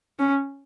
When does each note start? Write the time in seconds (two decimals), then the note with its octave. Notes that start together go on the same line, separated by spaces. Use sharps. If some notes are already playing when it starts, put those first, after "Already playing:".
0.19 C#4